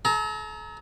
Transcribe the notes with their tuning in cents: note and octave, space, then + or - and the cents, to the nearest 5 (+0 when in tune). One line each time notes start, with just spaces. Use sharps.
A4 -45 A#5 +0